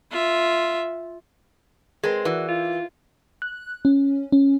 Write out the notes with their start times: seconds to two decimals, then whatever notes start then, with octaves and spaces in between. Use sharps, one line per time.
0.11 F4 E5
2.04 G#3 C4 G#4 A#4 B4
2.25 E3 F#4 A#4 B4 D5
2.48 F4
3.42 F#6
3.85 C#4
4.32 C#4